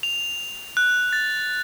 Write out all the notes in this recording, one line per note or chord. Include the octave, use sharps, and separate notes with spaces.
F7
F#6
A6